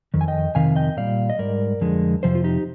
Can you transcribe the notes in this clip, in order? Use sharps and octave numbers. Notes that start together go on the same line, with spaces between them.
F2 D#3
G#5
D#5 G5
F2 C3 D#3 F5 G#5
D#5 G5
A#2 G3 D5 F5
D#5
G#2 G3 A#4 D5
F2 D3 F3 G#3
F2 C3 F3 C5
F4
D#4 G4